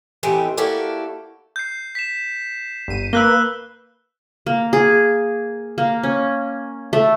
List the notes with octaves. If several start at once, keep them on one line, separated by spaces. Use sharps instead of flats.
E3 A3 B3 C4 D#4 G4
A#3 E4 F#4 G4 A4 D5
G6 C7
B6 E7
G1 D#7
A#3 B4 E6 F#6 G7
A#3
G#4
A#3
C#4
A3